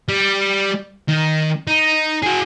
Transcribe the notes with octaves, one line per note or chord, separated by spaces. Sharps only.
G3
D#3
D#4
F#4 G#4